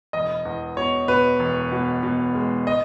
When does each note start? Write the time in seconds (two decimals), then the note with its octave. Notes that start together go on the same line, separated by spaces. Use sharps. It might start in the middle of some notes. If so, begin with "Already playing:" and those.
0.13 E1 D#5
0.45 E2
0.77 B2 C#5
1.08 B2 B4
1.39 E1
1.72 B2
2.03 B2
2.35 G#3
2.67 D#5